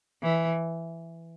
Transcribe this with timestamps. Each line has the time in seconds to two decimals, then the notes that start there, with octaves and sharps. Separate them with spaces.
0.22 E3